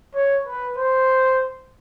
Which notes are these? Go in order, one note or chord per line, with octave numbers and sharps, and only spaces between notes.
C#5
B4
C5